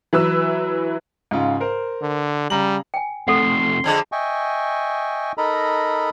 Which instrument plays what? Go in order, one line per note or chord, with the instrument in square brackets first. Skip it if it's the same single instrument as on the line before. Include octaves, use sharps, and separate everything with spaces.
[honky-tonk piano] E3 F#3 B4 E6
[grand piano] G#2 C#3 F4
A#4 C5
[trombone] D3
[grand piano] C#3 A#5 F#7 [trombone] G3
[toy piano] G5 G#5
[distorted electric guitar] C3 A3 [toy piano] A4 F#5 [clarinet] C6
[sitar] F2 D3 G#3
[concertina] D#5 E5 G5 G#5 C#6
D#4 A4 A#4 D#5 A#5 B5